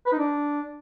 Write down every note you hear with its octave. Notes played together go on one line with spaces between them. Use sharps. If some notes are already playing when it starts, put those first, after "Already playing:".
B4
D#4
D4